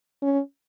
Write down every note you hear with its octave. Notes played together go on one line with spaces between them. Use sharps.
C#4